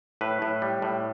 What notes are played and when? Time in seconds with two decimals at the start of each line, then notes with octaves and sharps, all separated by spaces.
0.21 A2 B4
0.42 A2
0.62 G3
0.82 A2